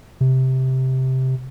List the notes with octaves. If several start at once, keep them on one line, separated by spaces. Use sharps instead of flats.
C3